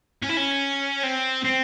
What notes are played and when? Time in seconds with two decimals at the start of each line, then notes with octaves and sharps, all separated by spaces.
0.22 C#4
0.29 E4
0.37 C#4
1.03 C4
1.44 C4